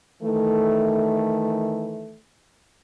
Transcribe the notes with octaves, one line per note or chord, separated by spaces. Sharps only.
D#3 E3 A3